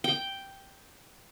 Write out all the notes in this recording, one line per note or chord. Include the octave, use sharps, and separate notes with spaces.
G5